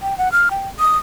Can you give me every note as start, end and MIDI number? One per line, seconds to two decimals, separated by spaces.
0.01 0.17 79
0.18 0.31 78
0.32 0.49 89
0.51 0.68 79
0.79 0.98 87